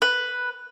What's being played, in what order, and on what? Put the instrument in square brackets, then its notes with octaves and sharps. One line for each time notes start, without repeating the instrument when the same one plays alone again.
[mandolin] B4